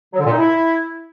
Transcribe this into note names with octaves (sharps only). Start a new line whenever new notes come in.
F#3
D3
A#2
D#4
E4